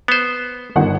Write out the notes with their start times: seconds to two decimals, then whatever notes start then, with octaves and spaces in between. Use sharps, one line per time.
0.08 B3 C5
0.75 G1 D#3 F#5